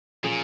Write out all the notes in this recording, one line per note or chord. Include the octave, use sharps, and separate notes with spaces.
A#2 F3 C#4 G#4